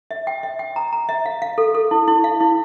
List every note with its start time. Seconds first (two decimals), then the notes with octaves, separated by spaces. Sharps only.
0.11 E5
0.27 G5
0.43 E5
0.59 G5
0.76 A#5
0.93 A#5
1.09 E5
1.26 F5
1.42 F5
1.58 A4
1.75 A4
1.91 E4
2.08 E4
2.24 F5
2.40 E4